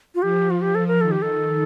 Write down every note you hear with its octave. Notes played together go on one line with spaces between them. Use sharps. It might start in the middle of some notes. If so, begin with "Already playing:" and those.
F4
F3 G4
F4
G4
A4
A#4
D#3 A4
G4
A4